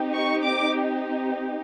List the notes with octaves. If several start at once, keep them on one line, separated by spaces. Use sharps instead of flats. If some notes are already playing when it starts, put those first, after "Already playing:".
Already playing: C4 D#4 G4
C#6
D6